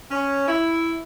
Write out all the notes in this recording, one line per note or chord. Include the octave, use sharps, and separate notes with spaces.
C#4
E4